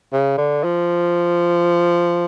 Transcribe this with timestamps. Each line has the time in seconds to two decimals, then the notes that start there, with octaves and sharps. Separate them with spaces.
0.13 C#3
0.38 D3
0.64 F3